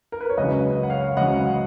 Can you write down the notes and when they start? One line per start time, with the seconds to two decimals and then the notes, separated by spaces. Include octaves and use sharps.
0.12 A#4
0.21 B4
0.29 C#5
0.37 C#2 C#3 F#3 B4 D#5
0.83 F#5
0.90 C#5 F5
1.17 C#2 C#3 F#3 D#5 F#5